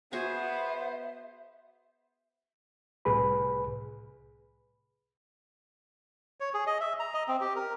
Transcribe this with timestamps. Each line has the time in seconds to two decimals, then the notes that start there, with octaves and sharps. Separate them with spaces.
0.13 B3 F#4 G#4 C5 E5 G#5
3.05 C2 A2 G#4 B4 B5
6.40 C#5
6.54 G#4
6.67 D#5
6.80 E5
7.00 A#5
7.14 D#5
7.28 C4
7.41 G4
7.56 A#4